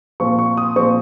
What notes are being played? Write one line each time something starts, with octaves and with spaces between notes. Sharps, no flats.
A#2 F3 C4 C#6
C#6
D#6
A#2 F3 C4 C#6